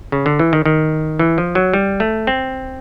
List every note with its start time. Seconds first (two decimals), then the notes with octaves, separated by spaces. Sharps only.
0.12 C#3
0.26 D3
0.39 E3
0.53 D#3
0.66 D#3
1.19 E3
1.38 F3
1.55 F#3
1.74 G3
2.00 A3
2.27 C4